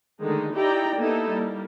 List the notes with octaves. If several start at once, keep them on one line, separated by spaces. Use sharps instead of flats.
D3 D#3 G#3 A3 D#4
D#4 E4 G4 D5 G5 A#5
A#3 B3 D#4 E4 G4 A4
G3 A#3